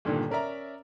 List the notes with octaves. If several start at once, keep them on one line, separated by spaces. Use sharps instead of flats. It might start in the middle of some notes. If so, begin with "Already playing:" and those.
G1 A#2 D3 D#3
C#4 A#4 D5 E5 A#5